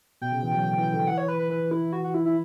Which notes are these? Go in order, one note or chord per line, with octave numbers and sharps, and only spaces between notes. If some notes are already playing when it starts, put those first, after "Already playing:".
B2 G5
C#3
E3
F#3
D3
E3
D3
E3 F#5
C#5
B4
B4
E3 B4
E4
F#4
F#4
E4
E4